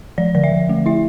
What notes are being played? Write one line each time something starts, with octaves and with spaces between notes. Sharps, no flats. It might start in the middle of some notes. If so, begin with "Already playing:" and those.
F3 D5
D3 D5
E5
D3
A3
E4 E5